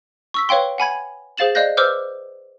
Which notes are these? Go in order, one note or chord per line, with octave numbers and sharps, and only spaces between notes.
C#6 E6 B6
B4 C#5 F5 G5 C6
F#5 G#5 B5 G#6
G#4 C5 F5 A6 E7 F#7
D5 D#5 F5 F#6 G6 A#6
B4 C5 D6 E6 F6 G6